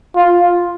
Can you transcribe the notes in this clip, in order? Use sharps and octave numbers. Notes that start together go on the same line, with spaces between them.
F4